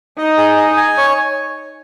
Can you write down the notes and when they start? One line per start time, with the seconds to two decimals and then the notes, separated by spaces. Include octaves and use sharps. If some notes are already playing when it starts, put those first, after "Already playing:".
0.18 D#4 D#5
0.37 G#4
0.57 D#5
0.77 G#5
0.97 C#5